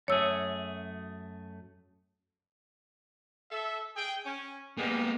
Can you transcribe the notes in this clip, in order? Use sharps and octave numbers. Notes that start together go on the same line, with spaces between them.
F#2 A3 G#4 C#5 E6
A4 E5
G#4 G5
C#4
G3 G#3 A#3 B3 G4